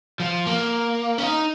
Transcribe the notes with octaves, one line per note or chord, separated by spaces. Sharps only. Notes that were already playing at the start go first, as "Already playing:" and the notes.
F3
A#3
C#4
D#4